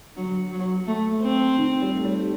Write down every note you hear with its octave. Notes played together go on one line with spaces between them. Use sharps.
D3 F#3
F#3
A3
C4
D#3
G3
A3
G3